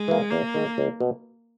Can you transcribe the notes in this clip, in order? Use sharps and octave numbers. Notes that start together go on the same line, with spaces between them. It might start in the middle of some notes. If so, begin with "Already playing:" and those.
Already playing: G#3
E3 A#3
E2 A#3
D#3 G#3
C#2
B2